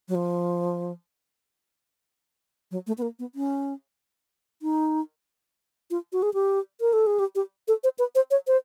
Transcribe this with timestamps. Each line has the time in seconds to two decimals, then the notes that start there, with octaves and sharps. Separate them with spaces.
0.08 F#3
0.15 F3
2.71 F#3
2.87 A3
2.98 B3
3.02 A#3
3.19 B3
3.35 C#4
4.62 D#4
5.91 F4
6.13 F#4
6.23 G#4
6.34 G4
6.81 A#4
6.93 A4
7.07 G#4
7.19 G4
7.35 G4
7.68 A4
7.84 C5
7.99 B4
8.15 C5
8.31 C#5
8.47 C5